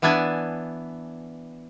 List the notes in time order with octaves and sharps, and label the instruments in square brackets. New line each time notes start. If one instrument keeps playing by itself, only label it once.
[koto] E3 B3 D4 E4 G#5 A5